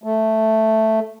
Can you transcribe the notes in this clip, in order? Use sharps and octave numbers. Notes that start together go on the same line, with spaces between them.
A3